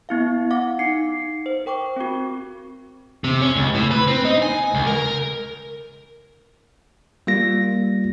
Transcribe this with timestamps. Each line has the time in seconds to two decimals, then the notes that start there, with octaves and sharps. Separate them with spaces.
0.09 B3 E4 F5
0.51 F5 F#5 D6
0.79 D#4 C7 C#7
1.46 C5
1.66 A#4 G5 C#6 D6
1.96 C4 F#4
3.24 C3
3.42 C#4
3.56 C#2
3.75 A2
3.91 B4
4.07 C4
4.25 D#4
4.42 G#5
4.74 C#2
4.87 A#4
7.27 G3 A#3 F4 A#6